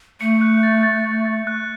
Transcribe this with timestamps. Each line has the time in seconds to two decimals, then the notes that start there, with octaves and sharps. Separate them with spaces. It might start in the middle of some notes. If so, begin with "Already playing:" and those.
0.21 A3 C#7
0.41 F#6
0.63 A6
0.83 A6
1.05 A6
1.25 A6
1.47 F#6